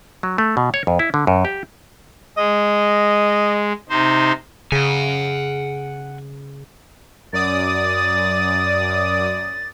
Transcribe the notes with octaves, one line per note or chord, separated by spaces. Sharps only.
F#3
A3
B2
C#5
F2
E4
D3
F#2
G4
G#3 D#5
C3 D#4 C5
C#3 F#5 G#5
F#2 D5 D#6 A6